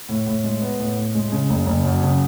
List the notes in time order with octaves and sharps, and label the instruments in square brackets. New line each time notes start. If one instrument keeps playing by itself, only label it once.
[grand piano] A2
A2
G#3
B3
A2
A2
G#3
C#3
F#1
F#1
F#2
C#3